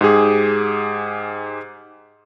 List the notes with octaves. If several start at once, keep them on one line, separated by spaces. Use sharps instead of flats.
G#2 G4 G#4